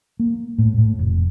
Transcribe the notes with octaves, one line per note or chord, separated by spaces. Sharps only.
A#3
A2
A2
F1